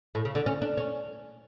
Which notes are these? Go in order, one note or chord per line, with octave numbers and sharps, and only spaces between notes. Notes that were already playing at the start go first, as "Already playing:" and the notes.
A2
C#3
D3
C#4
D4
C#4